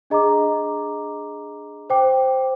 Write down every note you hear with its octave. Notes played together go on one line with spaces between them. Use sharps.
D4 G#4 D#5 A#5 D6
C5 G5 D6